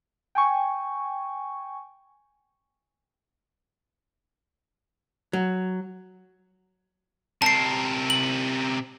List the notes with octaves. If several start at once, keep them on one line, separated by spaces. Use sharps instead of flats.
G5 G#5 C#6
F#3
C3 A#4 A5 C7
F#7